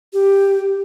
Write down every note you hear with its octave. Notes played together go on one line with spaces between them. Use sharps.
G4